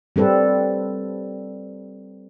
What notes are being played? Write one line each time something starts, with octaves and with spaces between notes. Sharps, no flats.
G3 C4 A4 B4